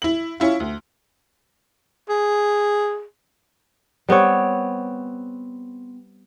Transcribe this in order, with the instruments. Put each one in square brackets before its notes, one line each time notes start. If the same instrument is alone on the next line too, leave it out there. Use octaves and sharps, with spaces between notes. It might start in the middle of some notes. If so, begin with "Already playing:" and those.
[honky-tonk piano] E4 F#7
C#4 E4 F4
D2
[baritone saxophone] G#4
[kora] G3 B3 C4 C#5